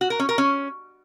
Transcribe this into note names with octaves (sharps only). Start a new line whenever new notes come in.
F#4
A#4
C#4
A#4
C#4